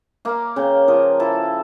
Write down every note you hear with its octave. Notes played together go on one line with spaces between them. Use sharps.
A#3 F5
C#3 G5
F3 A#4
E4 A4